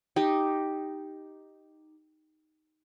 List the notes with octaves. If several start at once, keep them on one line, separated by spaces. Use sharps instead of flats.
D#4 G4